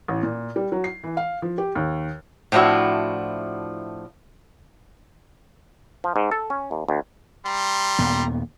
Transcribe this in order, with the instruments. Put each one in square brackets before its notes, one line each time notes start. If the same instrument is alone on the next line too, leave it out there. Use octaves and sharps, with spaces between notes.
[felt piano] A1
A#2
G3
F#3
C7
E3
F5
F3
G4
D#2
[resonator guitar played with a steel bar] A2 F3 D4 E4 F#4
[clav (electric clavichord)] F3
G#2
A4
C#4
D#2
D2
[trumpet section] G3 A#5 C6
[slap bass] D#2 A#2 B3